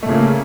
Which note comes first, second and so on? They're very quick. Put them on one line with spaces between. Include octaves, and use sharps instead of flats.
A3 A#2 C#3 A#3